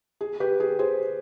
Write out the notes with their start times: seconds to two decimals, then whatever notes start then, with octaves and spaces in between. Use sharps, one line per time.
0.21 G#4
0.40 G4 B4
0.60 G#4
0.79 G#4 C5